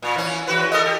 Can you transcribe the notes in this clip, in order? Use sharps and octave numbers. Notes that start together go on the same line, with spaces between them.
A#2
E3 C#4
E2 F#4 B4
A4 A#4 D#5
G4